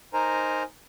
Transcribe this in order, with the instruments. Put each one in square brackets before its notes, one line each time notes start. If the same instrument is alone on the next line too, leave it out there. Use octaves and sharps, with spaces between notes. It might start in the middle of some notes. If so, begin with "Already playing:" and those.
[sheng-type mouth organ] D#4 A#4 C5 G#5 A#5